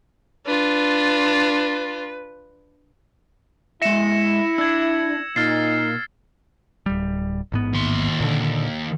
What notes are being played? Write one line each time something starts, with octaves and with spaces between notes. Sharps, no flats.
D4 F4 B4
G#3 E4 E5 A#6 C#7 E7
D4 E6 G#6
A#2 D#4 F6 A6 C7
D1 G3
A1 G#2 B3
D#2 C6
A#2 D3